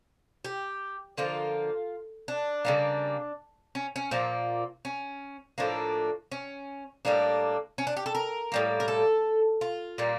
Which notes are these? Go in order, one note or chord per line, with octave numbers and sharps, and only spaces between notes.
G4
D3 F3 A#3 F4
D4
C#3 G3 A#3
C#4
C#4
A#2 F3 A#3
C#4
A2 F3 A#3 D4
C#4
A2 G3 A#3 D4
C#4
D4
G4
A4
A#4
A2 G3 A#3
A#4
A4
F4
A#2 G3 A#3